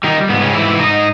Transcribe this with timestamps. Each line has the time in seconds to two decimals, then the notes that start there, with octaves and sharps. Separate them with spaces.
0.03 D#3 G3 D#4
0.29 G#2 B3
0.41 C#3 C#4
0.54 E3 G3 E4
0.79 G#2 D#4 D#5